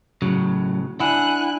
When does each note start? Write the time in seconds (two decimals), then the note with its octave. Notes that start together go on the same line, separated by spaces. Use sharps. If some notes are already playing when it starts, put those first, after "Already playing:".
0.22 A2 C#3 F#3
1.00 D4 E4 F#5 G#5 B5 F#6